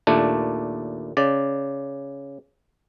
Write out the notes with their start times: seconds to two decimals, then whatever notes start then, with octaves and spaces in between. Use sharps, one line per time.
0.07 D#2 A#2 A3 D4
1.17 C#3 D5